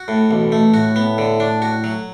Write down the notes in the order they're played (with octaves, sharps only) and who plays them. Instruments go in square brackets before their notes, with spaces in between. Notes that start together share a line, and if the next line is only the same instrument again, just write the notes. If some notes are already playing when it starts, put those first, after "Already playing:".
Already playing: [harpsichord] F#4
A2
[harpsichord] A1 [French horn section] B2
[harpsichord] A3
[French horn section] A2 [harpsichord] F#4
[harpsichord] B3
D3
D4
F#4
F#3